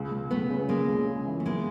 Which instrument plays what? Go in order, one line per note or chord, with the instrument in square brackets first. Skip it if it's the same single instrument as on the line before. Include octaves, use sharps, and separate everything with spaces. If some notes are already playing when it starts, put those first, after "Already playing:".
Already playing: [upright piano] C#2
C#2
[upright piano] C#2 [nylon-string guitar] A3 B3
[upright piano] C#3
[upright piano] C#3 [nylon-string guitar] G#3 A#3
[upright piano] C#2
C#3
E3
[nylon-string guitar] A3
[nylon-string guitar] G#3 A#3 [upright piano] B3